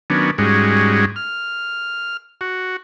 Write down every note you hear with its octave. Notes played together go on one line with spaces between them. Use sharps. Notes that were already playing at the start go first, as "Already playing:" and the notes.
D#3 F#3 B3 C#4 D4
G#2 G3 G#3 C#4 F#4
F6
F#4